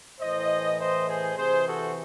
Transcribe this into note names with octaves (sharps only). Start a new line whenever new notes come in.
A2 E3 C5 D#5
C5 D#5
G#4 C5
C3 E3 G#4 C5
F#4 A4